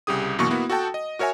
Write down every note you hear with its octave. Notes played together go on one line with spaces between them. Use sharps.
C2 C#3 G4 G#4 D#6
F#2 B2 E3 A#3 C#6
A#3 B3 E4 F#4
F#4 A4 F#5 G5 A5
D#5
F#4 A#4 C#5 E5 G#5